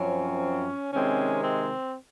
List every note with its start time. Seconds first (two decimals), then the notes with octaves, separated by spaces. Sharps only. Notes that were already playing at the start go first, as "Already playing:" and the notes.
Already playing: F#2 F3 C4 C#4
0.92 C3 D#3 G#3 C4 C#4
1.42 C4